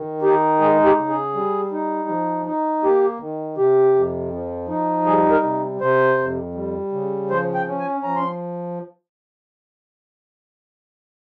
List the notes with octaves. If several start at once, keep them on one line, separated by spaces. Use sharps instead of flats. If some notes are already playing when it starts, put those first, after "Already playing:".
Already playing: D#3
D#4 G4
G#3 G#4
G4
C#3
G#4
G3
D#4
F3
D#4
A#3 G4
D#3
C3 G4
F2
F3
D#4
G3 G#4
A#4
C3
C3 C5
F2
G3
C#3
F3 C5
G5
C#4
G#5
F3 A#5
C6